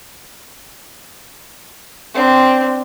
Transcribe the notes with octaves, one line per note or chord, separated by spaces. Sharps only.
C4 D4